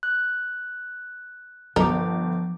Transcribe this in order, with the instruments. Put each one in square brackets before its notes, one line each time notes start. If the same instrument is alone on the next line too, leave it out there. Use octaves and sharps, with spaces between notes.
[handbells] F#6
[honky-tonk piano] G1 [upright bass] F3 [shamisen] A4 A#4 [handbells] C5 D6